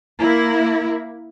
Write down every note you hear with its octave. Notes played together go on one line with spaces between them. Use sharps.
A#3 E4